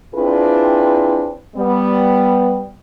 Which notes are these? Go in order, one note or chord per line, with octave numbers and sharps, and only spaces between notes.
C4 D4 E4 F4 G#4 B4
G3 B3